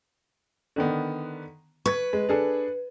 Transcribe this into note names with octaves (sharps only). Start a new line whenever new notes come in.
D3 D#3 B3
B4 C#6 G#6
G#3
D4 G#4 A4